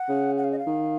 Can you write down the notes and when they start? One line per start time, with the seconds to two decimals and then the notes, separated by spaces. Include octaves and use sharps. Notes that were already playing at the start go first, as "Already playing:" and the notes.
Already playing: F#5
0.09 C#3
0.37 F#5
0.44 F5
0.52 D#5
0.59 F5
0.67 D#3